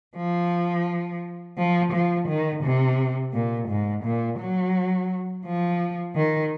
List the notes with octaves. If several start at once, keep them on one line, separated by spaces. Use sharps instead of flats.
F3
F3
F3
D#3
C3
A#2
G#2
A#2
F#3
F3
D#3